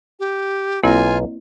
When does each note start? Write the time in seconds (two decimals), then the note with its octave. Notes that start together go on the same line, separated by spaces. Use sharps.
0.20 G4
0.83 B1 A#3 C4 E4 F4 G#5 A#5